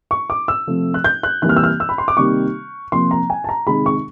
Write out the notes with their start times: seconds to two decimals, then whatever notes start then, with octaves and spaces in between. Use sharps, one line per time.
0.11 C#6
0.30 D6
0.48 E6
0.67 C3 F3 A3
0.94 F#6
1.04 G6
1.23 F#6
1.42 C3 E3 G3 A#3 F#6
1.49 F6
1.57 E6
1.64 F6
1.80 E6
1.89 B5
1.98 C6
2.08 D6
2.17 C3 D#3 G3 A#3 C#6
2.92 C3 F3 A#3 C6
3.11 A#5
3.30 G#5
3.44 A5
3.49 A#5
3.67 C3 D#3 G#3 B5
3.86 C#6